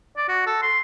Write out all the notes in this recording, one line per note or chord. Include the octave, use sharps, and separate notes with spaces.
D5
F#4
A4
C6